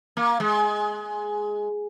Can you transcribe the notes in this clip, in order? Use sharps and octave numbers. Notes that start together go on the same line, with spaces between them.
A#3
G#3